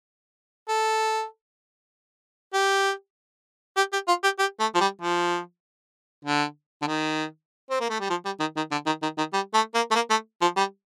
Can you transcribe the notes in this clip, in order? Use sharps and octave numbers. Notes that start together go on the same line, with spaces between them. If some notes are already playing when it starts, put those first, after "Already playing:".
A4
G4
G4
G4
F4
G4
G4
A3
F3
G3
F3
D3
D3
D#3
C4
A#3
A3
G3
F3
G3
D#3
D#3
D3
D#3
D#3
D#3
G3
A3
A#3
A3
A#3
A3
F3
G3